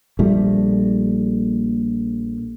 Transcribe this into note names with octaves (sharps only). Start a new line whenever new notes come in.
A#1 A#2 G3 A3